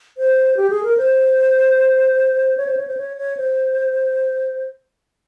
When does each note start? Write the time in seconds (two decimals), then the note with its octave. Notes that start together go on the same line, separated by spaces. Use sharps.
0.18 C5
0.57 G4
0.70 G#4
0.84 A#4
0.98 C5
2.57 C#5
2.67 C5
2.77 C#5
2.87 C5
2.97 C#5
3.17 C#5
3.37 C5